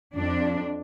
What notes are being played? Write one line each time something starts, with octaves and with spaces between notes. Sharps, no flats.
F2 D4